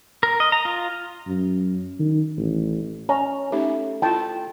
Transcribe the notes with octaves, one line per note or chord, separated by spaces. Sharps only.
A#4
D#5
A#5
F4
F#2
D#3
A1
C#4 A#5
A3 C#4 D#4 G4
E4 F4 G5 A5